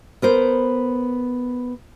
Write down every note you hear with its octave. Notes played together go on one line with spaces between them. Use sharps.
B3 A#4 C5